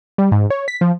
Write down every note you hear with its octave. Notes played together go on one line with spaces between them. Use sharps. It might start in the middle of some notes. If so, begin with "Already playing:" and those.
G3
G#2
C#5
B6
F3